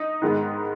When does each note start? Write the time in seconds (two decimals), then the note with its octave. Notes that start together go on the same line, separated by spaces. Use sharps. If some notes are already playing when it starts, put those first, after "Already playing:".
Already playing: D#4 D#5
0.22 G#2 D#3 G#3 B3